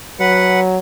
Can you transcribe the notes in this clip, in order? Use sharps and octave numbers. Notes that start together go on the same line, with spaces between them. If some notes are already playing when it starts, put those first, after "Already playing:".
F#3 B4 F#5